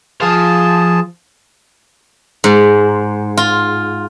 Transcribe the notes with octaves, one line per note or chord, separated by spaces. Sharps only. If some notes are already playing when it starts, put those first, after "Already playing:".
F3 G#4 F5 A5
G#2
F4